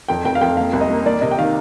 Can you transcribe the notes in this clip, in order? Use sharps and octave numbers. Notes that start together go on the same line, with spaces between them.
F2 G5
F1 G5
F5
F2 G5
A#3 F5
C2
D#5
A#3
A#3 D5
C3 D#5
G5
D#3 F5